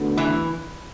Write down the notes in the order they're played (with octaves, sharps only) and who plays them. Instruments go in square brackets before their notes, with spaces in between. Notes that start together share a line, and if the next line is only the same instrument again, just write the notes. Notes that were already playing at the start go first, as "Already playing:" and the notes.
Already playing: [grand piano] D2 D3 F#3 B3
[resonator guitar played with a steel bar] E3